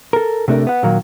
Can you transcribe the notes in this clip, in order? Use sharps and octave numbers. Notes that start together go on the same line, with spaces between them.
A4 A#4
C3 A3 D4 A#4
B3 F#5
A#2 D#3 F#3 A#3